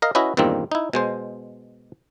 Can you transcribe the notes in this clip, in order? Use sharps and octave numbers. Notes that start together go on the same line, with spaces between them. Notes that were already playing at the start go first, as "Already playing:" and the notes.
A#4 D#5 F5
C#4 E4 F#4 B4 D#5
E2 G2 A#2 D#3 A#3 C4
D#4 E4
B2 G#3 C5